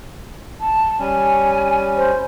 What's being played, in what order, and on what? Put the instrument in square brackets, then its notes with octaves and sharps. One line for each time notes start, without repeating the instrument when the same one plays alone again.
[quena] A5
[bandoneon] G3 C#4 [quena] G#5
[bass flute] C5